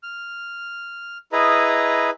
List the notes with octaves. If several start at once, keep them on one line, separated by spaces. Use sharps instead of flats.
F6
E4 G#4 B4 D#5 A#5